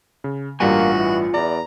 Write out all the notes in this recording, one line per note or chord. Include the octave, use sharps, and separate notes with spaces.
C#3
A1 G2 G3 A#3 F4 F#4 F#5 G#5
E3
E2 D5 A#5